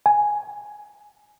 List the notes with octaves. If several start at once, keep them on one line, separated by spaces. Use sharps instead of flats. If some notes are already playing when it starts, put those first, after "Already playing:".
G#5